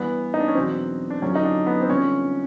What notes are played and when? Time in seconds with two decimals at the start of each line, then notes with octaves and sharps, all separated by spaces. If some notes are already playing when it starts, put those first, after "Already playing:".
Already playing: G2 E3 B3
0.34 D#4
0.40 D4
0.48 C#4
0.55 E2 B2 F#3 C4
1.10 D4
1.22 F#2 D3 F3 C#4
1.35 D#4
1.45 D4
1.67 B3
1.81 C4
1.89 G2 D3 F3 C#4